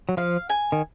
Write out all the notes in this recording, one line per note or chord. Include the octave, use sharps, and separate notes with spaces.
F#3
F3 F5
G#5
D#3